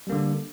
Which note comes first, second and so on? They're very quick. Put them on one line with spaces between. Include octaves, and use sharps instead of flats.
G3 A#3 D3